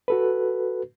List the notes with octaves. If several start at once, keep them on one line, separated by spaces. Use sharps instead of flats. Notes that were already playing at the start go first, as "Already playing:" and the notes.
F#4 A4 B4